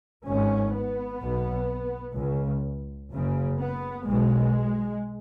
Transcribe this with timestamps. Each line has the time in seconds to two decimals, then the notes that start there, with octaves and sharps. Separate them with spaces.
0.26 G#1 G#2 C#4
0.73 B3
1.21 B1 B2
2.16 C#2 C#3
3.12 F#1 F#2 C#3
3.59 B3
4.06 B1 B2 G#3